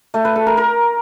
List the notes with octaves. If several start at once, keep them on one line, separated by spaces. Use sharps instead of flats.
A3
B4
A4
A#4
A#4